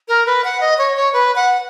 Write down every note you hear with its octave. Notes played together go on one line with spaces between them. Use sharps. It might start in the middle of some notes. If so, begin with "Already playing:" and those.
A#4
B4
F#5
D#5
C#5
C#5
B4
F#5